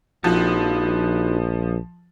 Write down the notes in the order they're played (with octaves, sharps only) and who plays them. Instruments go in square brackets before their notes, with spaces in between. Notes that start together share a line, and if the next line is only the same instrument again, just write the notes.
[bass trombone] A#1 [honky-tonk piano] F3 [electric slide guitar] D#4 F#4